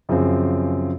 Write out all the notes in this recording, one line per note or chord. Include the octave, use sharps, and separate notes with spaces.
F#2 C#3 F3 C4